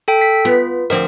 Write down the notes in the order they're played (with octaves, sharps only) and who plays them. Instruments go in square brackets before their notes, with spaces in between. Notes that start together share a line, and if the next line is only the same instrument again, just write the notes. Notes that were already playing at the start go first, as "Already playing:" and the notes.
[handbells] A4 G5
B6
[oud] B3 [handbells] F4
[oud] D2 F3 C4 [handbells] A#4